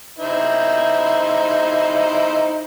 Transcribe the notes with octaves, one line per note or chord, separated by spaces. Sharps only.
D#4 E4 C5